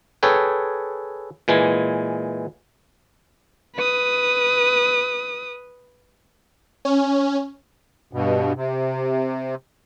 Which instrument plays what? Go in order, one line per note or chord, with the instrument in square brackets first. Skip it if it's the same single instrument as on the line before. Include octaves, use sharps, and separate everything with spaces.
[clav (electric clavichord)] G#4 A4 B4 C#5 G5
A#2 E3 G#3 G#5
[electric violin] B4 D#6
[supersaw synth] C#4
[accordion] G2 B2
C3